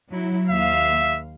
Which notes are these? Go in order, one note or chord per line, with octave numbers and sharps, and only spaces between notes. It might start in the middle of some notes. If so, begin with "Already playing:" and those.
F#3 E4
D#2 E5 F5